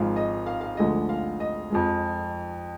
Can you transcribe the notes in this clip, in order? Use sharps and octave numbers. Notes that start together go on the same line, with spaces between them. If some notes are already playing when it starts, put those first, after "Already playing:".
Already playing: G#1 G#2 F3 G#3 F5
D#5
F5
F5
D2 D3 F3 G#3 D#5
F5
D#5
F2 F3 G#3